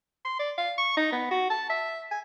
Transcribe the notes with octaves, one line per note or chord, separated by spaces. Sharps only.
C6
D5
F5
C#6
D#4
B3
F#4
A5
E5
G#5